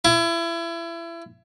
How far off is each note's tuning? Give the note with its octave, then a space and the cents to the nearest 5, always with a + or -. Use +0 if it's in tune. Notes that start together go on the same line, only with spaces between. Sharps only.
E4 +30